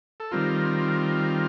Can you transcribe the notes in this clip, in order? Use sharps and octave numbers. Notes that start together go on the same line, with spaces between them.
A4
D#3 G3 C4 F4 A#4